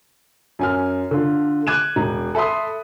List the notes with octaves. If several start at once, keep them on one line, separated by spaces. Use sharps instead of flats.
F#2 G#5 F6
D3 F4
D6 F#6 G#6 D#7 E7
E1
A4 E5 B5 C6 D#6